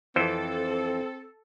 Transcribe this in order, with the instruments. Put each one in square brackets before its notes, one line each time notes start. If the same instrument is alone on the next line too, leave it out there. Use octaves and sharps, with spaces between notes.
[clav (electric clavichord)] F2 E3 C5 [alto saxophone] C4 [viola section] A4